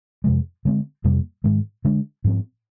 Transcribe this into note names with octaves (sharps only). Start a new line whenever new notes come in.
F2 C3 F3 G#3
D3 G#3 C4
F2 C3 G3 A#3
G#2 D#3 G#3
D3 G#3 D4
G#2 F3 C4